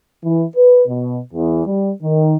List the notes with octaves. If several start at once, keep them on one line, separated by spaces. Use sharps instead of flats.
E3
B4
B2
E2
G3
D#3